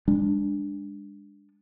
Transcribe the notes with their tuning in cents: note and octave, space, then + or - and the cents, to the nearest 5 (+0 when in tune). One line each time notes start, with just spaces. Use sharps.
G#3 -35 D4 +0